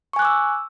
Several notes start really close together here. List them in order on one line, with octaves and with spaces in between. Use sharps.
C#6 G#5 F#6 D6 E6